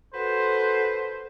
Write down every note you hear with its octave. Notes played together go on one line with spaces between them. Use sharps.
F#4 A4 B4 C5